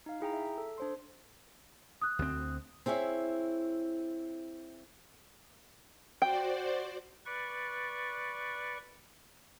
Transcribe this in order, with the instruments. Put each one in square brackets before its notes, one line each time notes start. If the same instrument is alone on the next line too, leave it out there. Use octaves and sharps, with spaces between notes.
[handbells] D#4 F5
E4 G#4 G5 A#5
E5
A4
D4 C5 C6
[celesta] D#6 F#6
[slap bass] D2 C4
[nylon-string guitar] C4 E4 G#4 C#5 E5
[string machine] F#4 C5 D5 [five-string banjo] G5
[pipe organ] B4 D5 C#6